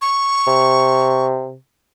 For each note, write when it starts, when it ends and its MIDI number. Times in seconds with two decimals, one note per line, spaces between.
0.02 1.26 85
0.47 1.55 48